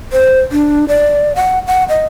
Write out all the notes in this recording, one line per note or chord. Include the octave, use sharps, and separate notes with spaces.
C5
D4
D5
F#5
F#5
D#5